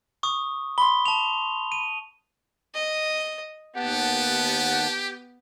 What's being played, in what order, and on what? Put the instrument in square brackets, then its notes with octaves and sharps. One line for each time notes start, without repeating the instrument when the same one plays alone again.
[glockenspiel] C#6 D#6
[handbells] B5 C6 [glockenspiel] G7
[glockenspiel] A5 F7
D#7
[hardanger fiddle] D#5
[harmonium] D#2 F#5 A5 [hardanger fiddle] B3 [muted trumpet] G4